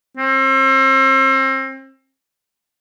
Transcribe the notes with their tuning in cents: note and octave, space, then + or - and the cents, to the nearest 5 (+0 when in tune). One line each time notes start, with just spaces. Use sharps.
C4 +35